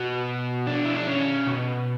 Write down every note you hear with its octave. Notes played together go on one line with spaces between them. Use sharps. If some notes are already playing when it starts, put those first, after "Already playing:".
Already playing: B2 F#4
D4
E4
D4
C#4
B2